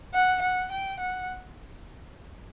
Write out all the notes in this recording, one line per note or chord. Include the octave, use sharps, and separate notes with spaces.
F#5
F#5
G5
F#5